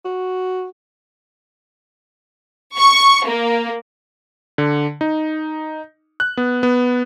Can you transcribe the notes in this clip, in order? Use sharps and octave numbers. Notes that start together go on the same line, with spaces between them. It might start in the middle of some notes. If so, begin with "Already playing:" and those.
F#4
C#6
A#3
D3
D#4
F#6
B3
B3